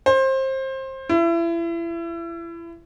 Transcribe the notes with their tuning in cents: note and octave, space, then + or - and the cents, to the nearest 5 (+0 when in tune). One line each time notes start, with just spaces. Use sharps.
C5 +25
E4 +30